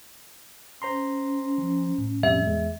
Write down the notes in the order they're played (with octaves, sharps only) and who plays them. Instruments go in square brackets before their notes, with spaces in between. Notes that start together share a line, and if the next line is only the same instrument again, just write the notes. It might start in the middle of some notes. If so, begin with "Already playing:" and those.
[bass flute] C#4 [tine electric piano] C5 A#5 C6
[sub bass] F3
A2
[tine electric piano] F2 B2 G3 [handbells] E5
[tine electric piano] E2 G#3